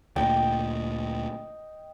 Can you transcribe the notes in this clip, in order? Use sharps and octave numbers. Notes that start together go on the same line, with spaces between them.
D2 A#2 D#5 G5